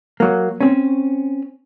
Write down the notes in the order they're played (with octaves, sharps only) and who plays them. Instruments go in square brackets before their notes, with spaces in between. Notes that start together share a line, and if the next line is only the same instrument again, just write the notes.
[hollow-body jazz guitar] F#3 A#3
C4 C#4